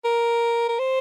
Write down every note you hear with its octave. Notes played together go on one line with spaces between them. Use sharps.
A#4
A#4
C5